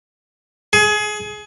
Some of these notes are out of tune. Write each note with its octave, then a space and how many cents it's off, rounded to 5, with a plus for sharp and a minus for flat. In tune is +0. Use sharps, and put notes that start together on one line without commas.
G#4 +25